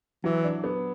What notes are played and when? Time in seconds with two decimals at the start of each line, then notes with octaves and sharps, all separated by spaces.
0.24 E3 F#3
0.44 D4
0.64 B3